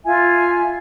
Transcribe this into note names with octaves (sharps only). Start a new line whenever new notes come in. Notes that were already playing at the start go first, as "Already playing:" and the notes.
F4 E5 G#5